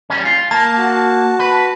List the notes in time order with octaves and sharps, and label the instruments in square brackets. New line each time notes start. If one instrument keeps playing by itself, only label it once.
[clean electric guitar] G3 C#4
F4
[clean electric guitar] A#3 [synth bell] A5
[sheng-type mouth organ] F#4
[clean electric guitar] B4